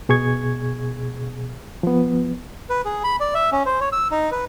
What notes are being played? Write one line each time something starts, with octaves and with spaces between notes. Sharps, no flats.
B2 G#4 C#6 G#6
F3 B3
B4
G#4
B5
D5
E5
C#4
C5
C#5
E6
D#4
B4